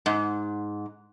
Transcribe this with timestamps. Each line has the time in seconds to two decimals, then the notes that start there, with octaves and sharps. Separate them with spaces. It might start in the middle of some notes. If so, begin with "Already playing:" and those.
0.06 G#2